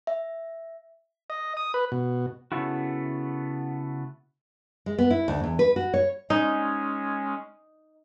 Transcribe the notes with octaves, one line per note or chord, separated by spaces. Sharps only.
E5
D#5
D#6
B4
B2
C#3 G3 A3 B3 E4 F#4
G#3
B3
E4
D2
E2
B4
F#4
C#5
G#3 C#4 D#4